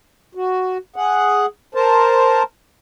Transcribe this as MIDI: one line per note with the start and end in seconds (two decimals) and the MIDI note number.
0.35 0.78 66
0.96 1.46 68
0.96 1.46 78
1.75 2.43 70
1.75 2.43 72
1.75 2.43 81